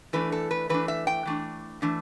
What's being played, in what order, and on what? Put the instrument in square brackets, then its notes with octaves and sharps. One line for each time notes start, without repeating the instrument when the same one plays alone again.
[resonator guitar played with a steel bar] E3 A3 D4 B4
A4
B4
E3 A3 D4 B4
E5
G5
E3 A3 D4
E3 A3 D4